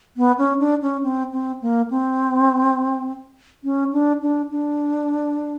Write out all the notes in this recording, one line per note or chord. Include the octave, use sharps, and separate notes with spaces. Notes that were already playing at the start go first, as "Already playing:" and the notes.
B3
C#4
D4
C#4
C4
C4
A#3
C4
C#4
D4
D4
D4